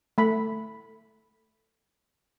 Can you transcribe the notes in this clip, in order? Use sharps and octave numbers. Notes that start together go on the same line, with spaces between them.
A3 B5